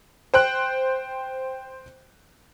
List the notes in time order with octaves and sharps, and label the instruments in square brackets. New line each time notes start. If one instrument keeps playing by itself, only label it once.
[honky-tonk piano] C5 G5 F#6